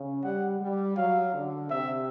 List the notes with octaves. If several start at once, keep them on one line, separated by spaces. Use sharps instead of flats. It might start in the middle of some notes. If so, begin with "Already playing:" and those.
Already playing: C#3
G3 F#5
G3
F#3 F5
D3
C3 E5